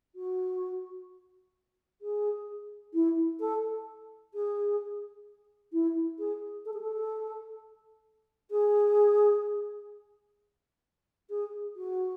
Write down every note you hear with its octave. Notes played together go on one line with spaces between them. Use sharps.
F#4
G#4
E4
A4
G#4
E4
G#4
A4
G#4
A4
G#4
G#4
F#4